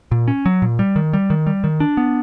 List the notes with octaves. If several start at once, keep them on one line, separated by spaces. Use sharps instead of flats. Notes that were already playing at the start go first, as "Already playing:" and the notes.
A#2
C#4
F#3
A#2
G3
D#3
G3
D#3
G3
D#3
D4
B3